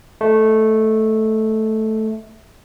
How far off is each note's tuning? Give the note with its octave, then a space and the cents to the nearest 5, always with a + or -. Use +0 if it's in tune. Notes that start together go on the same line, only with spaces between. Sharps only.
A3 -5 D#5 +10